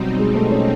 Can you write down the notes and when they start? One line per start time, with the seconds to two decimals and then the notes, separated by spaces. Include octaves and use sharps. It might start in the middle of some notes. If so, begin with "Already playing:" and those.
Already playing: B2 F#3 G3 C4 D#4
0.19 G#3
0.36 A3
0.52 C#4